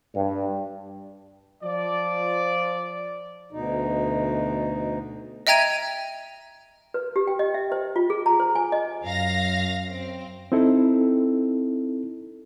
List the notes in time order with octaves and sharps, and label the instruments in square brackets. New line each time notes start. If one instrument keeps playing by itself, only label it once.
[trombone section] G2
[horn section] F3 D5
[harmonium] D2 B2 D#4
[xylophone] D#5 E5 G5 A#5 G#6 D#7
[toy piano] B4
G4
G5
D#5
E5
C5
F4
G#4
A#5
C5
G#5
D#5
[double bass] F#2 [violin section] F5 A#6
[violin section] C4
[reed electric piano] C4 D#4 E4 A4